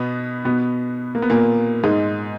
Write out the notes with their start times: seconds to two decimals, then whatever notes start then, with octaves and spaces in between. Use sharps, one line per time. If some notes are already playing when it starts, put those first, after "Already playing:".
Already playing: B2 B3
0.45 B2 B3
1.15 A#3
1.22 B3
1.30 A#2 A#3
1.83 G#2 G#3